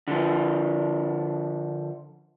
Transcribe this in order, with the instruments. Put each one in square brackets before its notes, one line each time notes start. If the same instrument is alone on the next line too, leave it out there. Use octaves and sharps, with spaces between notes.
[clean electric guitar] D3 F3